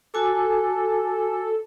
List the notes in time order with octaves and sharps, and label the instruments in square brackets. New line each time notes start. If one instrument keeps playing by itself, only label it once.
[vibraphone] F#4 G#5 D6 [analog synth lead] A4